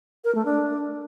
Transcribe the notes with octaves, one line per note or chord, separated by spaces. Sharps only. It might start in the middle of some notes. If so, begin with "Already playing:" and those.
A#4
A3
D4